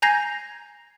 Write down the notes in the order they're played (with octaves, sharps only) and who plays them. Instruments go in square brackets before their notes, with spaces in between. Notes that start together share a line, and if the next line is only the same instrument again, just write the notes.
[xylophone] G#5 A#5 G6 G#6 A#6 C7